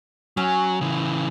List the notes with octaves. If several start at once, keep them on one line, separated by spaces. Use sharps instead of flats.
F#3 C#4
C#3 E3